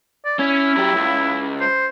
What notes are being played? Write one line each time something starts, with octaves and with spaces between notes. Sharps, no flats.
D5
C#4 E4
F#3 G4
C#2
C5